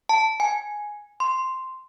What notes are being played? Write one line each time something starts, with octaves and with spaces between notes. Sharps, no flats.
A5
G#5
C6